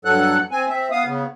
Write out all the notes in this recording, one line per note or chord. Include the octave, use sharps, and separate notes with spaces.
G2 F#3 A4 F#5 F#6
C4 G#5
C4 E5
B3 F5 D#6
C#3 B3